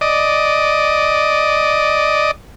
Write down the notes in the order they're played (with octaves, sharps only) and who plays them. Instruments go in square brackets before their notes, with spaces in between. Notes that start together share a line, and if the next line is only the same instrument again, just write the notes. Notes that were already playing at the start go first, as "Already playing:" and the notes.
[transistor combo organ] D5 D#5